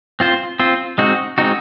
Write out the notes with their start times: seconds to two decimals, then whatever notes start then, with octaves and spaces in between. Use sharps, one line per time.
0.20 C4 F4 C5
0.59 C4 F4 C5
0.98 G#3 C4 D#4 F#4
1.38 G#3 C4 D#4 F#4